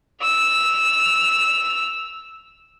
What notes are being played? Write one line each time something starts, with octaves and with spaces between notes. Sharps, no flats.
E6 F7